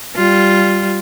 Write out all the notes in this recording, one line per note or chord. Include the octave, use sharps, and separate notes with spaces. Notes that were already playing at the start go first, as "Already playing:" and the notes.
G3 F4